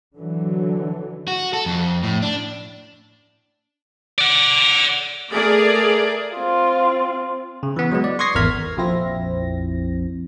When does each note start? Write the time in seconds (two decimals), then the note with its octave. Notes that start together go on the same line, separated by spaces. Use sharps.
0.18 D3 E3 F#3
1.28 F#4
1.53 A4
1.66 F2
2.03 A2
2.22 D4
4.18 D5 F#5
5.32 A3 G#4 A#4 D5
6.34 C4 F4
7.63 C#3
7.76 E3 B3
7.91 F#3 G#3 B3
8.04 D5
8.19 C6 C#6 D#6 G#6 A#6 C7
8.35 G#1 E2 A#4 F6 G#6 B6
8.77 A#1 F2 F3 C4 E4 A#6